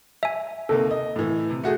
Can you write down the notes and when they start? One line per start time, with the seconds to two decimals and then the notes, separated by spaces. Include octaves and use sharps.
0.23 E5 G#5
0.69 D#2 C3 A#3 A4
0.91 D#5
1.16 A2 E3
1.50 C3
1.63 A3 F#4 G#4